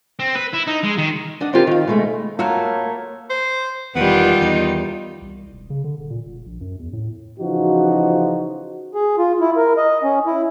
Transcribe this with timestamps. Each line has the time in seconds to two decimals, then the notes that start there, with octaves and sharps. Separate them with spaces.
0.19 C4
0.35 B4
0.53 E4
0.67 D#4
0.83 G#3
0.98 D#3
1.41 D4 D#5 F#5
1.53 D3 C4 D#4 F4 G4 A#4
1.67 D#3 F5
1.88 B2 G#3 A3
2.39 A3 A#3 F4 F#4 A#4 C#5
3.30 C5
3.95 E1 E2 D#3 G3 B3 F4
4.41 E2 D#4
5.22 C2
5.53 E1
5.70 C#3
5.84 D3
5.98 D#1
6.10 A#2
6.26 E1
6.46 A#1
6.61 F#2
6.79 E2
6.93 A2
7.39 C#3 E3 F3 D#4 F#4
8.95 G#4
9.18 F4
9.41 E4
9.57 A#4
9.77 D#5
10.03 C#4
10.26 E4